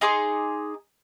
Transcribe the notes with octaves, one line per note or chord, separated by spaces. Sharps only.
D#4 G#4 C6 D6